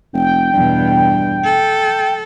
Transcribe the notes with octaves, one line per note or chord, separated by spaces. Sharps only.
F1 G5
E2 G2 B2
A4